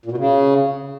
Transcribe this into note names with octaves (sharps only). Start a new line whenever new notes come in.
A#2
B2
C#3